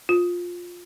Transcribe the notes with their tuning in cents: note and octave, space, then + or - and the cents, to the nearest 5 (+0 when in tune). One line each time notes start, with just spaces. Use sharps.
F4 +15